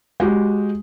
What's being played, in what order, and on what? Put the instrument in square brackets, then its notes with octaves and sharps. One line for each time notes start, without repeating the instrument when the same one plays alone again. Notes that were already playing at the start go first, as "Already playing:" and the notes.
[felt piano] G#3 F#4 G4